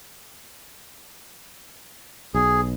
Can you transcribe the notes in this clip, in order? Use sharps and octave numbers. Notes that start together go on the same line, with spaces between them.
B1 G#4